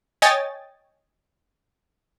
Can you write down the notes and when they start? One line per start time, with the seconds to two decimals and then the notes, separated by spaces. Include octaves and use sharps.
0.22 C#5 D#5 G5 G#5 A6